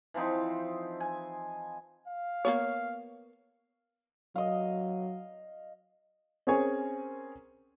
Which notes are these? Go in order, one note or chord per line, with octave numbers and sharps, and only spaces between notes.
E3 F3 C4 D#4
G#5
F5
A#3 B3 C#5
F#3 D#5 F5
C4 C#4 G#4 A#4 C#5 G#5